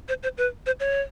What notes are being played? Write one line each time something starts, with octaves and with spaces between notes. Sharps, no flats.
C5
C5
B4
C5
C#5